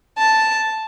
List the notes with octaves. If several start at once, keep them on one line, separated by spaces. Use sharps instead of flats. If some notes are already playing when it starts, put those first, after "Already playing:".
A5